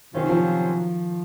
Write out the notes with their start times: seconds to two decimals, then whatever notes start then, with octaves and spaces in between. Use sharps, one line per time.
0.14 C3 D#3 F#3 C#4 F4 C5
0.29 F3